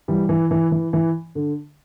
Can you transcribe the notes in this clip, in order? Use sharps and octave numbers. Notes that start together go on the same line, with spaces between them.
E3 G3
E3
E3
E3
E3
D3